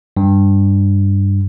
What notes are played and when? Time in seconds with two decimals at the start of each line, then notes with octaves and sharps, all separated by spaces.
0.17 G2